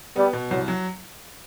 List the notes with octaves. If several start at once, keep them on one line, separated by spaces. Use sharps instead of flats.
G3 B3
B2
C2 F#3
F#3